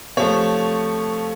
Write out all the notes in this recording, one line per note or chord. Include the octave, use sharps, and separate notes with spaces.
C3 F3 A3 C#5